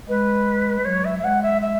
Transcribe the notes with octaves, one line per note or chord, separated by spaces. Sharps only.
G#3 B4
F#3 C#5
E5
E5
G#3 F#5
E5
E5